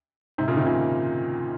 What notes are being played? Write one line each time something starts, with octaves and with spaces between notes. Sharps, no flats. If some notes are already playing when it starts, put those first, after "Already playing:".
G#2 C3
A#2 C#3
C3 D#3
A#2 C#3